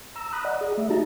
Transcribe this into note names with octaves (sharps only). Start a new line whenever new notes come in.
A#5 E6
A#5 B5 D#6 F#6
D5 D#5 F#5
G#4
A3 E5
D#4 F#4 G4 A5 A#5